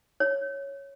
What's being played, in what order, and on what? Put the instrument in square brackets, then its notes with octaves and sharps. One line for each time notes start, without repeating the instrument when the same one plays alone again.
[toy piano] C#5